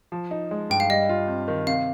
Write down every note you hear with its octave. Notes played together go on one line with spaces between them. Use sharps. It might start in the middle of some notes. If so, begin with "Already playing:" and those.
F3
D#4
G#3
G2 G5
F5
G3 D#5
F4
C4
D#3
C3 F5